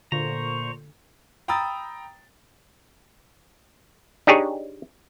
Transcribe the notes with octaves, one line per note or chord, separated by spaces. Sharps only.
A#2 D3 C5 A#5 C#6
G5 A#5 B5 D#6 E6 A6
D4 D#4 G4 G#4 C#5